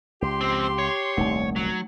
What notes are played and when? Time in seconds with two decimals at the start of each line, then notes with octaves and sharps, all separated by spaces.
0.22 C#2 G4 C6
0.41 F2 C4
0.78 C#5
1.17 D#1 C2 A3
1.56 F#3